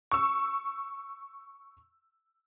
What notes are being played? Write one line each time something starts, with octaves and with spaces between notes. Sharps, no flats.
C#6 E6